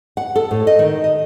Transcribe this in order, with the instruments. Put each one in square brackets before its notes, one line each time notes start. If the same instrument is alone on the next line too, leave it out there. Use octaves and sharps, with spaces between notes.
[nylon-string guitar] F#5
A4
A2
D#5
D#3
D#5